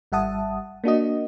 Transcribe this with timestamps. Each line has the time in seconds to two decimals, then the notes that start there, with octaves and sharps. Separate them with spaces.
0.12 G#1 G3 E5 F#5 A5 D#6
0.84 A#3 D4 F#4 D#5